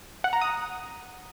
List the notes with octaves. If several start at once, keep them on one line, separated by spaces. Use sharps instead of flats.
F#5
A#5
D#6